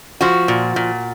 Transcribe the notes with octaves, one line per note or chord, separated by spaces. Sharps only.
F3 F#4
A#2
A#2